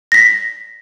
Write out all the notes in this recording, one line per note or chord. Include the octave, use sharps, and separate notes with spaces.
A#6 B6